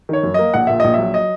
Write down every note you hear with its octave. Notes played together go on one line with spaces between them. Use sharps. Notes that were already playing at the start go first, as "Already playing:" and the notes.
D#3 C#5
F#2
A#3 D#5
A#1 F#5
A#2 E5
A#1 D#5
F#3 E5
D#5